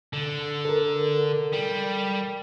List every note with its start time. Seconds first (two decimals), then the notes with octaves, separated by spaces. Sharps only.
0.13 D3
0.65 A4 A#4
1.53 G3